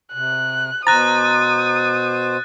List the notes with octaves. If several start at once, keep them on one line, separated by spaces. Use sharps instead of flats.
C3 F#6
B2 C5 A#5 D#6 F#6 A6